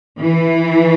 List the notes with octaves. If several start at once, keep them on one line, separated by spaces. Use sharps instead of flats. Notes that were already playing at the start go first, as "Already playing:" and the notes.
E3